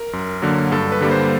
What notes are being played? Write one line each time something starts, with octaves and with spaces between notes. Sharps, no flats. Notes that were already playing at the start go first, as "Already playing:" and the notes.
Already playing: A#4
F#2
D3 F#3 A#3
G2 A4
B4
D3 G3 A#3
C5